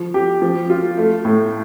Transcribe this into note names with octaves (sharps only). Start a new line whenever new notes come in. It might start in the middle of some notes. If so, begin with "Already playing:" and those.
Already playing: F3
G4
F3
F4
A3
A2